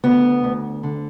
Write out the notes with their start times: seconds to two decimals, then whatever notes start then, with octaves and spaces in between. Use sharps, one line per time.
0.04 D2 B3
0.44 D2
0.83 D3